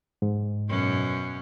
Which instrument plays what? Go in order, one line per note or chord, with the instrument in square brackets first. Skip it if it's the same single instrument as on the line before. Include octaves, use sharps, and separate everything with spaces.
[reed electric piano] G#2
[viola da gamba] F#2 B2 C#4